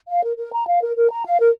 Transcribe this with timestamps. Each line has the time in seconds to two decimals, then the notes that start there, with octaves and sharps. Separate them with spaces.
0.08 F5
0.23 A#4
0.37 A#4
0.52 A#5
0.66 F5
0.81 A#4
0.96 A#4
1.10 A#5
1.25 F5
1.39 A#4